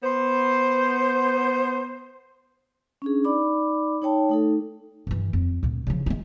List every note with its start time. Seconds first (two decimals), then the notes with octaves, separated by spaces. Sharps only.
0.03 B3 C5
3.02 C#4 D4 G#4
3.24 D#4 D5 B5 D6
4.02 D#4 C#5 G5 A5
4.29 A3 D#4 A4
5.07 G2 E3
5.33 F2
5.63 D2 A#2
5.87 C#3 F3
6.06 G#3 F4